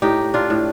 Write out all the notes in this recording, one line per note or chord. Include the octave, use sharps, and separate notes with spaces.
A2 D#4 G4
D4 F4
A2